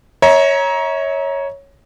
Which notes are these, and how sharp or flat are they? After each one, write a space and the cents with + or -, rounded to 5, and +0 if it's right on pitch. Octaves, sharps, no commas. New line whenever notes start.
C#5 +0 E5 -45 A#5 +20